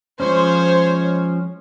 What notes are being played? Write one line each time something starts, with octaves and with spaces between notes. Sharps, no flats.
F3 G#3 C#4 C5 C#5